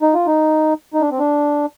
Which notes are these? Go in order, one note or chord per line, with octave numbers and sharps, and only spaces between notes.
D#4
F4
D#4
D#4
D4
C4
D4